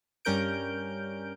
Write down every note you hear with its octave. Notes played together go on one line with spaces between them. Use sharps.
G2 G3 C#4 A#4 G6 D7